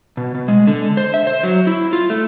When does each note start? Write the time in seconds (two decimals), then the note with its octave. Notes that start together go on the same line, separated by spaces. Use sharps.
0.17 B2
0.35 B2
0.48 G#3
0.67 D3
0.97 C5
1.14 E5
1.27 C5
1.44 F#3
1.67 E4
1.93 F4
2.10 A3